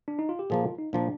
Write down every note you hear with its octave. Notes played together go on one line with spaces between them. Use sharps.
D4
D#4
F4
G4
A#2 F3 A#3 G#4
F4
D#4
A#2 F3 A#3 D4